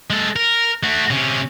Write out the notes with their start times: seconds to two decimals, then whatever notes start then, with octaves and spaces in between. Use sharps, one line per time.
0.10 G#3 A4
0.36 A#4
0.83 A3 F#4
1.10 C3 C#4